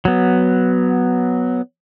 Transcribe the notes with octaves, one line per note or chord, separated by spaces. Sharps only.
F#3 B3